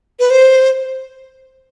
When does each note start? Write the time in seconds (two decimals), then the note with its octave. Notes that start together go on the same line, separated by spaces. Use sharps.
0.19 B4
0.30 C5